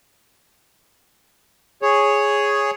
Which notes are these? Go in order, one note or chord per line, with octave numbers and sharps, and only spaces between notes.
G#4 C#5